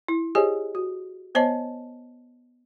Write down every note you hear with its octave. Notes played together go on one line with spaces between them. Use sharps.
E4
G4 G#4 C5 C#5 D#5 G#5
F#4
B3 C5 C#5 D#5 A5